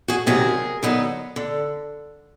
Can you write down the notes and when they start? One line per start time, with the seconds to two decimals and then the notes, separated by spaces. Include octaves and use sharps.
0.08 F#4 G#4
0.26 D2 C3 D#3 F#3 G#4 A#4
0.83 D3 F#3 B3 D#4
1.36 D3